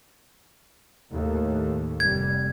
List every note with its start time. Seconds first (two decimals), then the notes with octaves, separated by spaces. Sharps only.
1.10 D#2 A2 A3
2.00 F1 G3 G#6